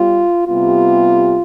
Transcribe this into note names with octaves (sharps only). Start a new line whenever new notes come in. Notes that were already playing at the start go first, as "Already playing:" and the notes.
Already playing: G3 B3 F4
C3 G3 B3 F4